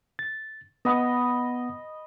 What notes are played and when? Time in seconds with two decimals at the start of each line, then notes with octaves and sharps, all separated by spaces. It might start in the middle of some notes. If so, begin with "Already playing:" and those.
0.19 A6
0.85 B3 D#5 F#5 B5 D#6